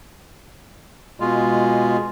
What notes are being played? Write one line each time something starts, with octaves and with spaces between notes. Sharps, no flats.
B2 G#3 F4